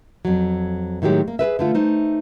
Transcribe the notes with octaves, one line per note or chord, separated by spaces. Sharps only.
F2 F#3
A2 D#3 F#3 G#3 G4 C#5
A#3
G#4 A#4 B4 E5
D3 A3 F4
A3 D#4 C5